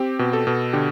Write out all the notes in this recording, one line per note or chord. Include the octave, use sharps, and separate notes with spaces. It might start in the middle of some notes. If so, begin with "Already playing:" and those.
Already playing: C4 G4
B2
A4
B2
D3 G4